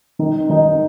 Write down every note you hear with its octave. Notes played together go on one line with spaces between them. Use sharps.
D#3 D#4
D#3 D#4